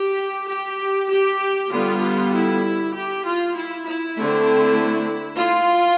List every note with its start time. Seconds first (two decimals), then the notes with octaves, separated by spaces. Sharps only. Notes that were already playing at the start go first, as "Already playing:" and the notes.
Already playing: G4
0.48 G4
1.09 G4
1.70 D3 G3 B3 F4
2.32 E4
2.94 G4
3.24 F4
3.55 E4
3.85 E4
4.17 D3 A3 C4
5.39 F4